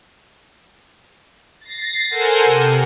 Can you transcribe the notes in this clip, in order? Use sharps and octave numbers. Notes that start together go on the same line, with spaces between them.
A6 A#6 C7
A4 A#4 C5 F#5 G#5
C3